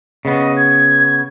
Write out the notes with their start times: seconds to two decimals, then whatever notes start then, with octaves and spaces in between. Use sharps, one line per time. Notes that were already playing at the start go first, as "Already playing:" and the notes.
0.25 C#3 B3 D#5
0.56 G#6